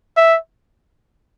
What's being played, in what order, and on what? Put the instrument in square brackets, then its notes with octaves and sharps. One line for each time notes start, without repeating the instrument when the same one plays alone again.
[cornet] E5